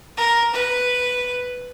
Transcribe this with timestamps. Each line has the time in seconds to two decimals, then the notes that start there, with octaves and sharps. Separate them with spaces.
0.17 A#4
0.54 B4